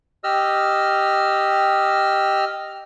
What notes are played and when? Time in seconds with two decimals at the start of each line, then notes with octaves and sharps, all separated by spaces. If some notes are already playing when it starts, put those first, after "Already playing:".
0.24 G4 D#5 E6 F6